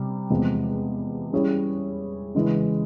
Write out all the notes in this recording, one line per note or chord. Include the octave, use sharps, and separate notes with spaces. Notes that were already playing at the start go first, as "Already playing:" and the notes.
Already playing: C3 G3
E2 C3 F3 G#3
G3 C#4 E4 G#4 C#5
C#3 E3 G#3 C#4